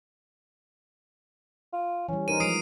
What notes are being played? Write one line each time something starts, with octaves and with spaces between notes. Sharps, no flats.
F4
E3 G3 C#4
D#4 A#4 C5 D#7
F3 G#3 D#6 C7 D7